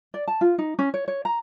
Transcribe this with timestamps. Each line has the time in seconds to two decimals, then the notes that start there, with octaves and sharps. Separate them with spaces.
0.14 D5
0.28 A5
0.41 F4
0.58 D#4
0.79 C#4
0.94 C#5
1.08 C#5
1.25 A#5